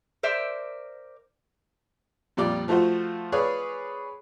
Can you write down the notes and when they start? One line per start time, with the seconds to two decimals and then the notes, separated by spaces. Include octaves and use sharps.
0.23 A#4 C5 D5 E5
2.37 F2 A#2 G3 F4 D5 D6
2.68 F3 A3 F4 F#4 C5
3.32 G#4 B4 C#5 D5 F5